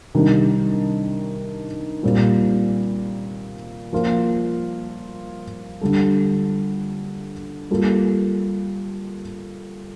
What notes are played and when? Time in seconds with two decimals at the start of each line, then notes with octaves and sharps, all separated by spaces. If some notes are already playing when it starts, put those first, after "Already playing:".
0.15 C3 D#3 G3 D4 G4
2.03 A#2 G3 C4 F4
3.93 F3 A#3 F4
5.81 D3 G3 D4 A4
7.71 G3 A#3 F4 A4